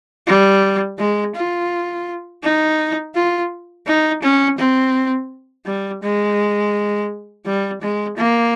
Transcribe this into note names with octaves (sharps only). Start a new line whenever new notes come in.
G3
G#3
F4
D#4
F4
D#4
C#4
C4
G3
G#3
G3
G#3
A#3